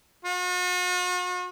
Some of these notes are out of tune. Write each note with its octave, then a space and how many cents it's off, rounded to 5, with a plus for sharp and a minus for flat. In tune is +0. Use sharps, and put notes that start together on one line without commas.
F#4 -45